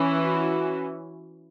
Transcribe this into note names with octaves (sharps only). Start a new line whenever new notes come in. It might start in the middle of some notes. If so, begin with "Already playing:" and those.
Already playing: E3 C#4 E4
F#4